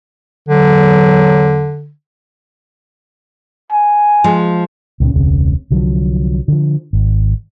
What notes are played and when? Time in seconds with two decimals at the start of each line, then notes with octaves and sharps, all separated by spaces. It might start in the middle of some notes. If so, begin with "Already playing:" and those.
0.49 E2 D3 E3 F#3
3.72 G#5
4.24 F3 G#3
5.00 C#2 A#2 G3 C#4
5.14 E1 C#2 C#3 C4
5.70 C2 D3 F3 F#3
6.48 D3 F3
6.93 G#1